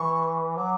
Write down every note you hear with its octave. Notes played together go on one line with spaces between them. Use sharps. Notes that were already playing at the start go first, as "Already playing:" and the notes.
Already playing: E3 C#6
F#3 D6